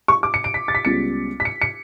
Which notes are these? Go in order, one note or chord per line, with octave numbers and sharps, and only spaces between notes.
C#6
D6
C#7
D7
B6
A6
B6
C#2 C#3 G3 B3 C#7
B6
C#7
C#7